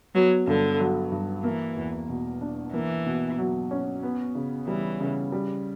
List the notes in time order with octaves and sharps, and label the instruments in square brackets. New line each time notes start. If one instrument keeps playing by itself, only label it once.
[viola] F#3 [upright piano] B3
[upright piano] G2 [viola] D3
[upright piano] F#3
G2
[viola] E3 [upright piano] A#3
[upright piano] E2
B2
D4
[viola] E3 [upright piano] A#3
[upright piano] B2
F#3
C#4
B3
C#3
[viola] E3 [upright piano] G3
[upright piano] C#3
G3